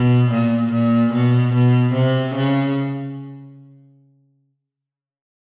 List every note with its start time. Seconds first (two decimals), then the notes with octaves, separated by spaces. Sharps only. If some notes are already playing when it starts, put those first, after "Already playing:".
Already playing: B2
0.32 A#2
0.72 A#2
1.13 B2
1.54 B2
1.94 C3
2.35 C#3